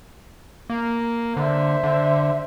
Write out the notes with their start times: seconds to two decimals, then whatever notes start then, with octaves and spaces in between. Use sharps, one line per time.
0.70 A#3
1.37 D3 C5 E5
1.84 D3